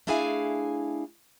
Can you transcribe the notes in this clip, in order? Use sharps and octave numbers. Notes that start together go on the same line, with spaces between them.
A3 D4 E4 G#4 F5 G#5